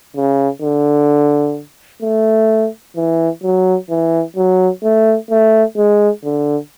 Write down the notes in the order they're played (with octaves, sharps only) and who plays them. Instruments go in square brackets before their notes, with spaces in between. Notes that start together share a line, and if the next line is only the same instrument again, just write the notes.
[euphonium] C#3
D3
A3
E3
F#3
E3
F#3
A3
A3
G#3
D3